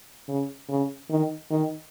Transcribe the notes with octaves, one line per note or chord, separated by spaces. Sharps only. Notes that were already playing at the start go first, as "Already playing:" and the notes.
C#3
C#3
D#3
D#3